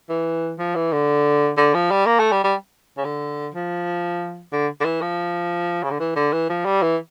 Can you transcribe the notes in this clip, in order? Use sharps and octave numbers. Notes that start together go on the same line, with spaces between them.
E3
F3
E3
D3
D3
F3
G3
A#3
A3
G3
G3
C#3
D3
F3
D3
D3
E3
F3
C#3
D3
E3
D3
E3
F3
G3
E3